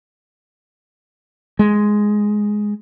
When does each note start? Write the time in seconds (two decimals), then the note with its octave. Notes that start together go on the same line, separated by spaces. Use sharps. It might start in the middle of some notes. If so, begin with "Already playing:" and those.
1.59 G#3